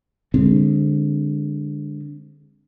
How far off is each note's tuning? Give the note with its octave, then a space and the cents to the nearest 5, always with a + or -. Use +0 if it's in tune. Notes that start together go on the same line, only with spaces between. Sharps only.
D3 +0 G#3 -30 C4 +0